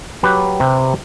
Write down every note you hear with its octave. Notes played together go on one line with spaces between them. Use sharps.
F#3 G4 B4
C3